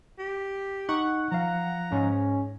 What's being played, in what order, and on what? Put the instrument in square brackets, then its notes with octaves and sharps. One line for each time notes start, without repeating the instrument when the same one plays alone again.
[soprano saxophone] G4
[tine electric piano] D#4 C#6 [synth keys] F#5
[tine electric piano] F3 F5 [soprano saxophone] A#5
[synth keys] G#2 [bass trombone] C#4